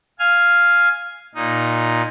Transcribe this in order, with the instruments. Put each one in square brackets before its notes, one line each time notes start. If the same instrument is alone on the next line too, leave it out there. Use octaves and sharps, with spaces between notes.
[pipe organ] F5 G#5 F6
A#2 D#4